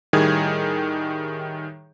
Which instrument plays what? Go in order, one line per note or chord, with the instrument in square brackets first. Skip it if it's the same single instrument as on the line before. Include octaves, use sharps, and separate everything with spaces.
[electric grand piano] A2 D#3 G3 G#4 G#6